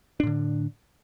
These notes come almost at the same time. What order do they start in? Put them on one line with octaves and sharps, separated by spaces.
D4 A2 D3